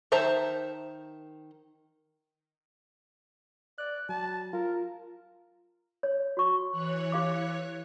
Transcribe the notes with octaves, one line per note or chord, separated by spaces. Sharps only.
D#3 C5 E5 A5 A#5
D5 F#6
F#3 A5
F4 A#4
C#5
F#4 C#6
E3 C#5 F#6
G4 F5 D6